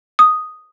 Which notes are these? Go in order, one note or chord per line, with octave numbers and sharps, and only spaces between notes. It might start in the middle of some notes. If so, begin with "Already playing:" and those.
D#6